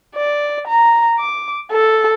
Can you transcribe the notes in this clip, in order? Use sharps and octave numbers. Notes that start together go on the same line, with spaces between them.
D5
A#5
D6
A4